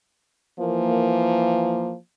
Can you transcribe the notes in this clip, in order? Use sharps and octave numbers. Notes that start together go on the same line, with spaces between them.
E3 F3 A#3